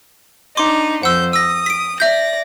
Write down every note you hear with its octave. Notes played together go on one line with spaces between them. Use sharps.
D4 D#4 C6 D6
F2 C5 F#5 E6 G6
D#6 E6 A#6
B6 D7
D5 E5 G6 A#6